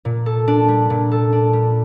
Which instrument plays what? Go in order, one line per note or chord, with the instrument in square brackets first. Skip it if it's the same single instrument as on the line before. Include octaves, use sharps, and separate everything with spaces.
[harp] A#2
A4
D4
G3
A#2
A4
D4
G3